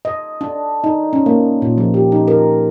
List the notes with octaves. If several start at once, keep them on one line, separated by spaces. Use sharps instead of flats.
D#5
D4
D#4
C#4
A#3
A#2
F3
G4
D#4
A#4